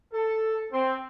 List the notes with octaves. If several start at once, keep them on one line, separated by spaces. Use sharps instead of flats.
A4
C4